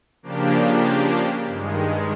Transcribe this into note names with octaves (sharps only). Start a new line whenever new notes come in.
C#3 F3 A#3 D4 G4
G2 D#3 G#3